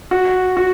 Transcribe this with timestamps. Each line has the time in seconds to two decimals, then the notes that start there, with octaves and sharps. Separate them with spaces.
0.11 F#4
0.57 F#4